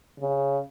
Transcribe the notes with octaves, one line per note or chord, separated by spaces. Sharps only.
C#3